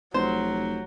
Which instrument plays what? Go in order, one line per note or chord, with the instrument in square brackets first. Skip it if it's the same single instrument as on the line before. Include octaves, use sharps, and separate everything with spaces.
[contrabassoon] F1 [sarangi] F#3 [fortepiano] C5